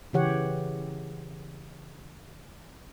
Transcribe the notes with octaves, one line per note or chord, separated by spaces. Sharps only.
C#3 E3 G4 C#5 F#5